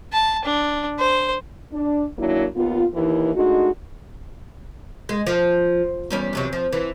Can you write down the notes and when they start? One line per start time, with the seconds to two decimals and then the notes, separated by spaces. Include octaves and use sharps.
0.13 A5
0.45 D4
0.99 C5
1.72 D4
2.18 D#3 F#3 A#3 D4 E4
2.56 D#2 A#3 B3 F4
2.94 D#2 E3
3.33 G#3 A3 D4 D#4 F#4
5.09 G#3
5.27 F3
6.10 E2 G3 C#4
6.33 E2 C3 F#3
6.53 F3
6.73 E3